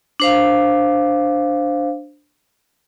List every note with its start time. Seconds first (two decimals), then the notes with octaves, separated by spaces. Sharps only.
0.20 D4 C5 F5